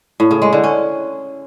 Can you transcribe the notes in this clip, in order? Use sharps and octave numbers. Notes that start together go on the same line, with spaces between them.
A2
C#3
G#3
D3
C#4